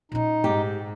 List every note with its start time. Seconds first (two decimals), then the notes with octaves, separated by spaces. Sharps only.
0.12 A#2 C#4 D#4
0.44 G#2 G4